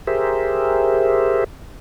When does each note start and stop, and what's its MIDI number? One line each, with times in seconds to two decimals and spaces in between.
0.07 1.44 67
0.07 1.44 68
0.07 1.44 70
0.07 1.44 72
0.07 1.44 76